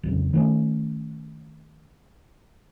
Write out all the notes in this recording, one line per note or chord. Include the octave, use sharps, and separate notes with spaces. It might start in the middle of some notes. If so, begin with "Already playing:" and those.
B1 F2 C#3
D#3 A3 B3 C#4